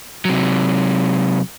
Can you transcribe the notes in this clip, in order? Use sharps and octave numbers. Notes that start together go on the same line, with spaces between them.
C3 F#3